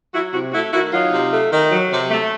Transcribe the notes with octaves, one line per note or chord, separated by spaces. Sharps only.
F#3 E4 F#4
C3 E4 F#4
A3 E4 F#4
D#3 E4 F#4
F#3 D#4 F4
C3
A3
D#3
F#3
C3
A3